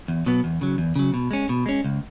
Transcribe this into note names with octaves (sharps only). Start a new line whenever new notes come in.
E2
B2 F#3 B3
E2
C#3 F#3
E2
C#3 F#3
B2
G#3 C#4
B2
G#3 C#4
C#2